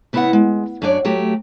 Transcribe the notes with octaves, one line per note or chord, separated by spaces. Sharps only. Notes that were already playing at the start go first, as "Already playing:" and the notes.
C#3 B3 E4 C#5 D#5 F#5
G#3
F#2 F#3 D4 C#5 D5
F#3 A3 G4